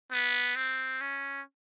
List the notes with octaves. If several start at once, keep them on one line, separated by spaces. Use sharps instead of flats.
B3
C4
C#4